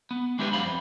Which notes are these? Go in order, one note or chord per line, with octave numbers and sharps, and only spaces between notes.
B3
G#3 D4 E4 G4 A#4 B4
F#2 C5 F5 B5
F2